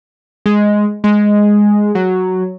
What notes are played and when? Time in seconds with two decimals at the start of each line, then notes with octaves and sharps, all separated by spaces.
0.46 G#3
1.04 G#3
1.95 F#3